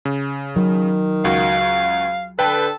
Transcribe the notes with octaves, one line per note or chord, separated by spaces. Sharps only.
C#3
D#3 F#3
C#2 F#4 F5
D3 A4 B4 G5 A5